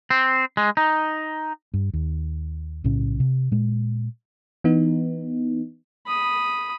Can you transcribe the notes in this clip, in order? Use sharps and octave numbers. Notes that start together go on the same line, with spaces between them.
C4
G#3
D#4
G2
D#2
B1 A2 C#3 C#4
C3
A#2 G#3
E3 B3 D#4
B5 D#6